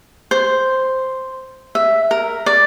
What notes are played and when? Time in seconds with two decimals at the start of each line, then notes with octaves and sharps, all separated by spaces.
0.31 C5
1.75 E5
2.11 A#4
2.46 D5